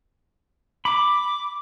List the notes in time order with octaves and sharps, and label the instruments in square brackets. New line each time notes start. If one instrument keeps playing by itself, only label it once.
[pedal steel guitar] B5 [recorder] D6